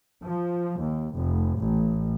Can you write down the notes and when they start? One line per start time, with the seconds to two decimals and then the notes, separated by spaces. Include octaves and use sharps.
0.23 F3
0.80 D#2
1.15 F1
1.57 A1